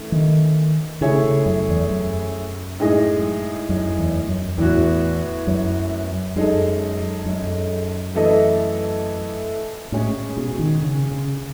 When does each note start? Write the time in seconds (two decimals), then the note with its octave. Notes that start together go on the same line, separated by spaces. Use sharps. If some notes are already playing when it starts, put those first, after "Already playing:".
Already playing: E3 A3 C#4
0.12 D#3
1.01 C#3 A3 E4 G#4 C#5
1.24 C#3
1.46 F#2
1.68 E2
1.90 F#2
2.80 A2 G#3 D#4 G#4 D#5
3.69 F#2
3.98 E2
4.28 F#2
4.58 E2 A2 E3 B3 F#4
5.47 F#2
6.36 F#2 G#3 D#4 A4
7.26 F#2
8.15 E3 A3 E4 A4 D#5
9.92 A2 G#3 C#4 G#4 C#5
10.37 B2
10.59 D#3
10.82 C#3
11.11 C#3